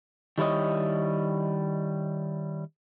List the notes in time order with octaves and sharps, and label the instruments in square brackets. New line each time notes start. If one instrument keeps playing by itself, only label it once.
[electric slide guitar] D#3 G3 E4 C#5 D#5